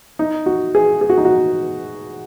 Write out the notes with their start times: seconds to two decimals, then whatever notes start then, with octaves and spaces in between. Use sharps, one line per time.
0.19 D#4
0.46 F#4
0.75 G#4
1.01 G#4
1.10 F#4
1.18 D#4
1.25 F#4